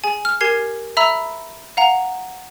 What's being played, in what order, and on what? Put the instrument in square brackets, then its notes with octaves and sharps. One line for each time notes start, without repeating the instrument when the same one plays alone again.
[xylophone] G#4 G#5
F6
G4 A#4 G#5 G#6 C7
E5 A#5 B5 E6
F5 F#5 A#5